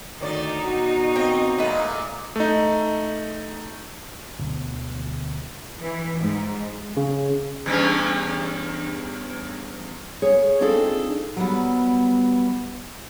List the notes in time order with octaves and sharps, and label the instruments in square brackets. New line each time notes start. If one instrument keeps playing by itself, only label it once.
[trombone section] D2 [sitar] D#3 C#5 D5 [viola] D#4
[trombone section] B2 F#4
[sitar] A#2 D#5 [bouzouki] C4 G5
[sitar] A#2 G#3 A3 [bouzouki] B4 D#5
[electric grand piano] A3 D#4
[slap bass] D2 B2 D3 F#3
[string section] E3
G#2
[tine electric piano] C#3
[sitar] E2 G2 C#4
[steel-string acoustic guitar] G#4 C#5
C4 D4 D#4 F4 G#4 A4
F#3 G3 B3